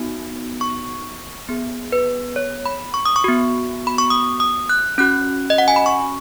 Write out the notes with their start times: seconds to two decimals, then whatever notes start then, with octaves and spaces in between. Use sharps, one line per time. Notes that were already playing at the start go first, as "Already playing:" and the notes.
Already playing: B3 D#4 F#4
0.61 C#6
1.49 B3 G#4
1.92 B4
2.36 C#5
2.66 B5
2.94 C#6
3.05 D#6
3.16 C#6
3.24 B3 F#4
3.87 B5
3.98 C#6
4.10 D#6
4.40 D#6
4.69 F#6
4.98 C#4 F#4 F#6
5.50 D#5
5.58 F#5
5.68 G#5
5.76 B5
5.86 C#6